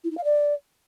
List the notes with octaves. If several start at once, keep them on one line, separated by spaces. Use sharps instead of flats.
E4
D#4
F5
D5